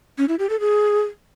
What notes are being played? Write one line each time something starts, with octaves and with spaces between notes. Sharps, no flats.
C#4
E4
G4
A4
G#4